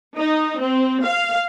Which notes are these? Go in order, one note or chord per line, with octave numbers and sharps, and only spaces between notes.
D#4
C4
F5